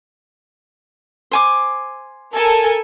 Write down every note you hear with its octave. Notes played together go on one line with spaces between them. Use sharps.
C5 G#5 D6
A4 A#4 G#5